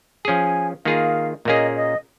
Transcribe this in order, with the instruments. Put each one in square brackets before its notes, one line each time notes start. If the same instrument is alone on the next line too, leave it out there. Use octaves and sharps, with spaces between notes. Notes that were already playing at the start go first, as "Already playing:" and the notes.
[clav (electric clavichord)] F3 C#4 G#4 [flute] G#5
[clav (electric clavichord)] D#3 A#3 F4 G#4 [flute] F5
[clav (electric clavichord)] A#2 A#3 C#4 G#4 [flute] D#5
[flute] D#5